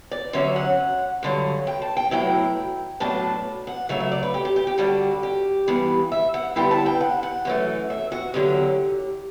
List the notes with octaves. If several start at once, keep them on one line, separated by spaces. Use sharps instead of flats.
D5
D3 F#3 C#4 E5
F#5
G2 D3 F#3
G5
A5
G5
A2 F#3 B3 E4 G5
A2 F#3 B3 D4 A5
F#5
C#3 F#3 A3 E5
E5
D5
B4
G4
G4
G4
G4
D3 G3 D4 F#4
G4
G2 E3 B3
E5
F#5
D3 G3 B3 E4 G5
A5
G5
F#5
F#5
F#2 E3 A3
E5
F#4
E2 D3 F#3 C#4 G4